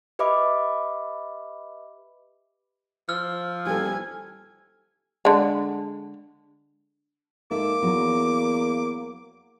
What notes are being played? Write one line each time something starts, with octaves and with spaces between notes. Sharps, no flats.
G4 B4 D#5 E5 B5 D6
F3 E6 F6
G3 A4 G#5
D3 G#3
G#2 A#3 A4 E5 D6
E2 F#3